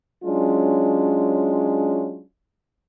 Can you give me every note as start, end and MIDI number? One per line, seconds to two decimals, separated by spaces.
0.24 2.22 54
0.24 2.22 56
0.24 2.22 61
0.24 2.22 62
0.24 2.22 65